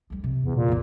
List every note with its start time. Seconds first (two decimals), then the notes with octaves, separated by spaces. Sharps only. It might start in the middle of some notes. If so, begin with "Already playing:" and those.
0.10 D2 G3
0.24 C3
0.43 E2
0.55 A#2
0.68 F2 E3